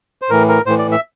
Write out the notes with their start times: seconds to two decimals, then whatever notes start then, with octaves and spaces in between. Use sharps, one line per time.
0.22 C5
0.30 A2 E3 A#4
0.49 A#4
0.66 A2 E3 C5
0.78 D5
0.92 E5